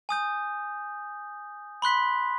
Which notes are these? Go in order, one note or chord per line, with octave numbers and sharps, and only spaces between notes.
G#5 D#6 G6
B5 C6 F#6 B6